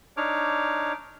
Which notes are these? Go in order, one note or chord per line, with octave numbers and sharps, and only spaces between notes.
D4 D#4 C#5 D6 F6